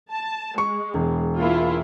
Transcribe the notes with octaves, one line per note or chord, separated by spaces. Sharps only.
A5
G#3 C#6
E1
A#3 E4 F4